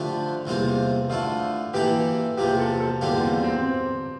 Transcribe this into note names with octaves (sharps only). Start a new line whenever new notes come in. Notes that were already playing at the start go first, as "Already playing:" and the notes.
Already playing: D3 F3 A3 D4 F4 G4
E2 C3 G3 A#3 F4
D3 A3 E4 F4
E3 A#3 E4 G4 A4
E2 C3 F3 A#3 G4
A4
A4
E2 D3 G3 A#3 F4 G4
C4
C4